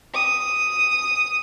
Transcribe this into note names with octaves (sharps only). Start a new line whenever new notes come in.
D#6